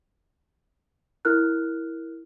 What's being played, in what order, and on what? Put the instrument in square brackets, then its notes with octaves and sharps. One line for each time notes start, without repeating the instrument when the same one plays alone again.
[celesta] E4 A#4 F6 F#6